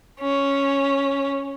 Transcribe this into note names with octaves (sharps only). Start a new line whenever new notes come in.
C#4